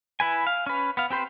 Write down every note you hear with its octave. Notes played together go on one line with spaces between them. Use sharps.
E4 B4 G#5
F5
C#4 B4
B3 F5
C4 G4 B4 C5